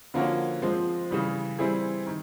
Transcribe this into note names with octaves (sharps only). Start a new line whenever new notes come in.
D3 F3 A#3 C#4 F#4
F3 G#3 C4
C#3 E3 G3
E3 G3 C4 E4 G#4
D#3